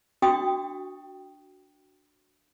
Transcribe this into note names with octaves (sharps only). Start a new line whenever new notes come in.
D4 F#4 E5 G5 C#6 D#6